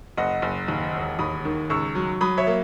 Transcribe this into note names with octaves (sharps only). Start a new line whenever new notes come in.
F#1 D#5 F#5
F#1
D#2
E1
D#2 B5 D#6
D#3
C#2 C#6 E6
F#3
F#3 B5 D#6
C#5 E5
A#3